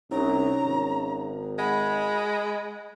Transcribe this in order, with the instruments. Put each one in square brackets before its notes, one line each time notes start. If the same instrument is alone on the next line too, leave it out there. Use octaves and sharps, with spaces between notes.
[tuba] C2 [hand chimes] C#4 D#4 C#5 [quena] A#5
[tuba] G#1
[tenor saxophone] G#3 [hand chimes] F#5 [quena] B5